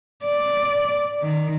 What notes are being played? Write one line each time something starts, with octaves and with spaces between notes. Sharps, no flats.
D5
D#3